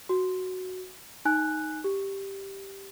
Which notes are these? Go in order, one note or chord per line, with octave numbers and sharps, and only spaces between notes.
F#4
D#4 G#5 F#6
G4